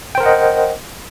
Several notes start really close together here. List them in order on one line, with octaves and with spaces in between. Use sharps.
G5 C5 A#4 F#5 D#5